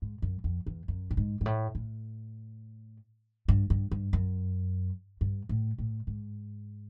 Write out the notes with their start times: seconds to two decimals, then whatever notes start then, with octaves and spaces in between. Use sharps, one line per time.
0.02 G#2
0.22 F#2
0.44 F2
0.66 E2
0.88 F#2
1.11 A2
1.17 G#2
1.41 G#2
1.46 A2
1.75 A2
3.48 G2
3.70 G2
3.91 G2
4.13 F#2
5.21 G2
5.49 A2
5.78 A2
6.07 G#2